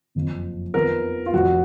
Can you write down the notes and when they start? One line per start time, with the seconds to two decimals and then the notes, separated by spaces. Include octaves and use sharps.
0.15 F#1 F2 F3
0.74 F2 F3 B3 D#4 A#4
1.26 F4
1.33 F1 F2 F3 F#4